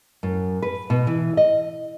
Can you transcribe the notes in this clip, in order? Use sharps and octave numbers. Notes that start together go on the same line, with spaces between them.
F#2
B4
B2
E3
D#5